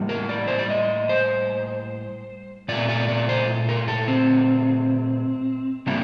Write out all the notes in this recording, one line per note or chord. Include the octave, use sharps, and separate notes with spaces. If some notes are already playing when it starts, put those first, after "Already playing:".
Already playing: A2 G3 A#3
A#4
D5
C5
D5
D#5
C5
A#2 A3 D5
D5
D5
C5
A#4
A4
C4
C3 G3 A#3 D4